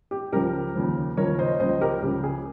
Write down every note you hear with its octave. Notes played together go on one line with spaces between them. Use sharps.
G4
C#2 C#3 F3 G4 A#4
D#2 C#3 F3
D#2 C#3 F3 A#4 C#5
C5 D#5
C#2 C#3 F3 C5 D#5
G4 A#4
C#2 C#3 F3 G4
G#4